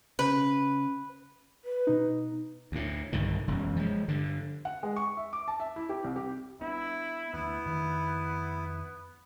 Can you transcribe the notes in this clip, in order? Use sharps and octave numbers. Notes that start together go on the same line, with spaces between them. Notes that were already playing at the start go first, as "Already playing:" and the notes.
C#3 B4
B4
B2 D#4
D2 A2
B1 G2 D3 D#3
E1 F#2
F3 G#3
G2 D3
F#5
G#3
C#6
E5
D6
A5
E5
E4
G4
C2
G4
B3 D4 E4
D2 B3 E4
F2 D#3